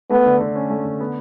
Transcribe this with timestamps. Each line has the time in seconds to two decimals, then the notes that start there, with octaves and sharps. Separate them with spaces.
0.10 A3 B3
0.26 D3
0.40 D3
0.55 C#4
0.70 A3
0.85 D3
1.00 B3